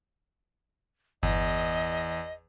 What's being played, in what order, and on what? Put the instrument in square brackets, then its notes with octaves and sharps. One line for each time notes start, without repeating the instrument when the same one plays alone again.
[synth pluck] G1 [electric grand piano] E2 [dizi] D#5